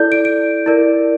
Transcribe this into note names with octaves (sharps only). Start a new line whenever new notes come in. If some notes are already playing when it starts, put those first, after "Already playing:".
Already playing: E4 A4 D5 G6
D7
D7
E4 A#4 D5